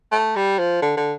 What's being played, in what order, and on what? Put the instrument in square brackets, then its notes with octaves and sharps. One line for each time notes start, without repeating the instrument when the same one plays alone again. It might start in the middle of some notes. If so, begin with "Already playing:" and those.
[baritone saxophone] A3
G3
F3
D3
D3